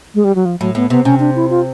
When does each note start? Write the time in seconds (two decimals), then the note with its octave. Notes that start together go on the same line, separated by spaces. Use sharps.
0.15 G#3
0.24 G3
0.35 F#3
0.45 F3
0.60 A2 F#3
0.75 A2 B3
0.90 C3 B3
1.05 C3 C#4
1.20 D4
1.36 E4
1.50 F4